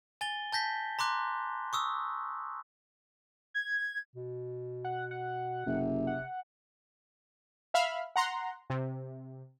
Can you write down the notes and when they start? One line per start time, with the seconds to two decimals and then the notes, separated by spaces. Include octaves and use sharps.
0.21 G#5 A6 G7
0.52 A5 G6 A#6 B6
0.99 A#5 C6 D6 F#6
1.73 C#6 D#6 E6
3.54 G#6
4.16 B2
4.84 F#5
5.11 F#5
5.66 F#1 C3
6.07 F#5
7.74 E5 F5 B5 F6
8.16 F#5 A#5 C6
8.70 C3